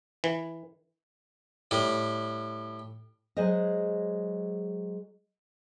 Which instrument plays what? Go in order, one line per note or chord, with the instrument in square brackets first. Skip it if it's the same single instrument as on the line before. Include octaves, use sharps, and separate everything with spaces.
[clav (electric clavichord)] E3
[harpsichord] A2 G3
[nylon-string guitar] F#3 G#3 G#4 C5 D#5